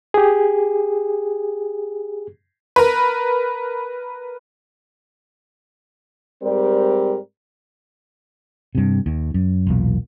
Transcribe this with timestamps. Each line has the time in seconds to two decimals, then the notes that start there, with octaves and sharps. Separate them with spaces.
0.14 G4 G#4
2.76 A#4 B4
6.43 G#2 G3 C4 G4 A#4 D5
8.75 G2 C3
9.06 D#2
9.34 F#2
9.67 E1 B1 A#2